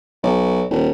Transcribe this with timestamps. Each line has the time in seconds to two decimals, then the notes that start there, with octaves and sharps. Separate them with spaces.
0.23 B1
0.70 D#1